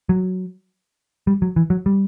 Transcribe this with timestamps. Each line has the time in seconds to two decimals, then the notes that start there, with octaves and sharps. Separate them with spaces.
0.09 F#3
1.27 G3
1.42 F#3
1.56 E3
1.70 F#3
1.86 G3